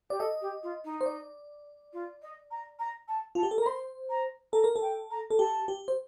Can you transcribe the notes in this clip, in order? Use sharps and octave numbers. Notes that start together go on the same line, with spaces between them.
G4 D5
A4 D#5
G4
F4
D#4
C5
D5
F4
D#5
A#5
A#5
A5
F4 A5
G4
A4
A#4
A#5
C5 C6
A#5
A4 A#5
A#4
A4
G5
A#5
A4
G4 A5
G4
C5